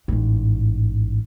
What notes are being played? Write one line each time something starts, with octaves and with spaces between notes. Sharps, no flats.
A1 G#2